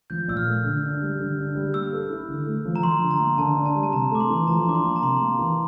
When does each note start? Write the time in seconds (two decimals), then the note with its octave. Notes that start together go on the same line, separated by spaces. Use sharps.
0.10 F3 G6
0.28 A#2 E6
0.37 F6
0.47 A3
0.64 D3
0.83 D4
1.02 G3
1.19 D3
1.38 D4
1.55 G3
1.74 A#3 E6
1.93 A4
2.10 E4
2.28 D3
2.46 A3
2.65 F3
2.76 A#5
2.83 F3 C6
3.02 D3
3.11 A#5
3.19 A#3
3.38 D3 A5
3.56 D4
3.66 A5
3.75 G3
3.83 A5
3.93 C3 A#5
4.11 A3 D6
4.20 C6
4.30 E3
4.47 F3 A#5
4.66 D4 D6
4.75 C6
4.84 A#3
4.96 A#5
5.02 C3 C6
5.21 A#3
5.39 E3